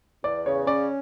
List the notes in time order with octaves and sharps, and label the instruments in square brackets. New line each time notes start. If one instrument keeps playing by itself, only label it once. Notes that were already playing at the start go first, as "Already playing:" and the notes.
[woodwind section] E2 [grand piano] D5
[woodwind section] C#3 [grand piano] C#5
[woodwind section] C#4 [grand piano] D5